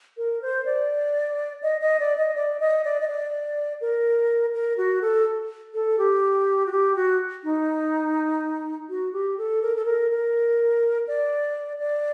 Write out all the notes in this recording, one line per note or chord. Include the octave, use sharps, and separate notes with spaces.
A#4
C5
D5
D#5
D#5
D5
D#5
D5
D#5
D5
D#5
D5
A#4
A#4
F#4
A4
A4
G4
F#4
G4
F#4
D#4
F#4
G4
A4
A#4
A4
A#4
A#4
D5
D5